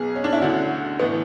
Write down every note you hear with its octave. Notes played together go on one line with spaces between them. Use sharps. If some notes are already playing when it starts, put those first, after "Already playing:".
Already playing: B1 B2 G#4
C#4
D4
E4
D2 D3 F#4
A2 E3 B3